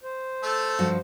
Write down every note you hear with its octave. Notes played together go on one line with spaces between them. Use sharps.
C5
A3 A4
G2 F3 F#4